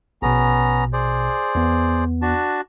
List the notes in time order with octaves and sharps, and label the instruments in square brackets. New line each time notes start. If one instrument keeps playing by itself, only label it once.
[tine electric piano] A#1 B2 [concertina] B3 C#4 A#5
[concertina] G#4 C5 D5
[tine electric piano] E2 B3
[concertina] D4 F#4 A5